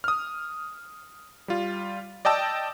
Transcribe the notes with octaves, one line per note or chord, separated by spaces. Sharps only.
D#6 F6
G3 F4
D5 D#5 G5 A5 E6